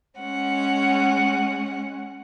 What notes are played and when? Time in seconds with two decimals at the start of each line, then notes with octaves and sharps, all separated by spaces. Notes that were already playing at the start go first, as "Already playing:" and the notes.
0.18 G#3 C#4 F#5